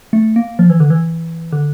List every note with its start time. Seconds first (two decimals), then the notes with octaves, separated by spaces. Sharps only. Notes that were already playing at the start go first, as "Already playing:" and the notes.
0.13 A3
0.36 A#3
0.59 F3
0.70 E3
0.80 D3
0.90 E3
1.52 D3